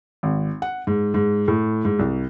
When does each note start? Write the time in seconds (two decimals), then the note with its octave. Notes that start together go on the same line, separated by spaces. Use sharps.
0.23 G#1
0.62 F#5
0.87 G#2
1.14 G#2
1.48 A2
1.85 G#2
1.99 C2